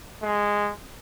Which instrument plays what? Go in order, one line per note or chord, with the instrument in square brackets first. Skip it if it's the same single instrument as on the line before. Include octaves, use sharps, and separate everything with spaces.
[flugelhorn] G#3